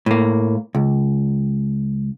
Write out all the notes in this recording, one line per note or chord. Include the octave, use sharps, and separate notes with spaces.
A2 A#3
C#2